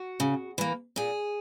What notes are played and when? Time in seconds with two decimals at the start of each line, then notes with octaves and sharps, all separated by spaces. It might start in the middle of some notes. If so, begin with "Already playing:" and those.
Already playing: F#4
0.20 C#3
0.58 E3 A#3
0.96 A#2 G#4